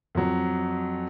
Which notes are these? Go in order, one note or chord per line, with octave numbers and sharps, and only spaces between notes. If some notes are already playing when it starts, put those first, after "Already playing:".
F2 F#3